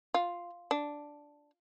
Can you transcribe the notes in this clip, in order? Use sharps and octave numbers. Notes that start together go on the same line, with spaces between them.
F4
D4